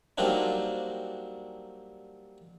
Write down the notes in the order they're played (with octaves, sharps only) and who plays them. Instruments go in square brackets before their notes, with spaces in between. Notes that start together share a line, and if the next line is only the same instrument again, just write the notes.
[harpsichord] F#3 G3 A#3 C4 D4 D#4